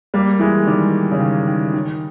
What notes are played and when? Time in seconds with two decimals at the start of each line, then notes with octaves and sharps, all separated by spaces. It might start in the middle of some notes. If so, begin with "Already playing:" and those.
0.14 G3 A#3
0.40 E3 G#3
0.67 D#3 G3
1.12 C#3
1.20 D#3
1.47 D#3
1.74 D#3